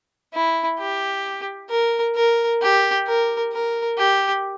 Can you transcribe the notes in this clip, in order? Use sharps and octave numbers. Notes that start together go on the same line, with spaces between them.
E4
G4
A#4
A#4
G4
A#4
A#4
G4